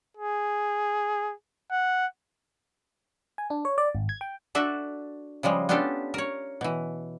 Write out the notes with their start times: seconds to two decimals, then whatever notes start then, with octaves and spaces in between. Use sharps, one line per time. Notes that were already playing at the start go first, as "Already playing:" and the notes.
0.17 G#4
1.71 F#5
3.38 G#5
3.50 D4
3.65 C#5
3.78 D5
3.95 G#1
4.09 G#6
4.21 G5
4.55 D4 F#4 A4 E5
5.43 C#3 F3 G3 G#3
5.69 B3 C#4 D4 F4 G4 A4
6.14 A#4 C#5
6.61 B2 E3